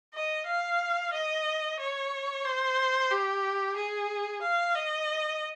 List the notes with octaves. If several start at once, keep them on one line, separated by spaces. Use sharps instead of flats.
D#5
F5
D#5
C#5
C5
G4
G#4
F5
D#5